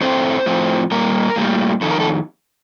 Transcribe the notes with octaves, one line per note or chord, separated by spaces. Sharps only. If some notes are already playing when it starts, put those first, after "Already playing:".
A2 A3 C4 C5
A2 F3 C4
A#2 G3 A#3 A#4
A2 G3 A#3
F2 D#3 A4
A#4
A4